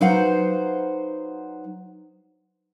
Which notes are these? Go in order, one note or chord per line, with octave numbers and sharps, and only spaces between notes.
F#3 D#4 B4 C5 F5 F#5